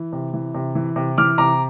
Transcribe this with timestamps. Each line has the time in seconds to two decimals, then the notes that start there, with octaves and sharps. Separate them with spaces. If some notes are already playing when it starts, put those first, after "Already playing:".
Already playing: E3
0.13 C3
0.34 E3
0.54 C3
0.75 E3
0.96 C3
1.18 E3 D6 F6
1.38 C3 A#5 D6